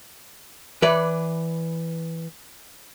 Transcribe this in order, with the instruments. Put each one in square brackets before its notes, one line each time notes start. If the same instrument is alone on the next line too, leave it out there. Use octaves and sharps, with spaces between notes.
[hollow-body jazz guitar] E3 B4 D5